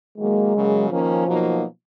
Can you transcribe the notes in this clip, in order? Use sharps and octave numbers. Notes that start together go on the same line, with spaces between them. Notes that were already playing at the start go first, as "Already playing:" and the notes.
D#3 F#3 G#3 A#3
F#2 C#3 F#3 A#3
D#3 F3 A#3 C#4
B2 F#3 A#3 D#4